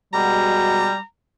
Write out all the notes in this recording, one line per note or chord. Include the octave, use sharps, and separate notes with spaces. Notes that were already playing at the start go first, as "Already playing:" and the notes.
B2 G3 G#3 F#4 A#5